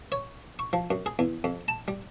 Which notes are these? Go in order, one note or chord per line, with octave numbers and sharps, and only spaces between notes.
C#5
C#6
F3
F#2
G#4
E2
F2
A5
G3